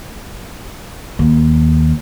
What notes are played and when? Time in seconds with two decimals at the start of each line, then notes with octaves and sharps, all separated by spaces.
1.19 D#2